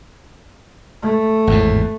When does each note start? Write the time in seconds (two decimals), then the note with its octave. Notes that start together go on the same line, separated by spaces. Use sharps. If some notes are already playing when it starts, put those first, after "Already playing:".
1.02 A3
1.47 G#1 E2 A2